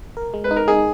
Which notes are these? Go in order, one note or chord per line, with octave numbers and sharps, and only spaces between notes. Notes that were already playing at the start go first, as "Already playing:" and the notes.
A#4
G#3
B4
D#4
A#4
D#4 G#4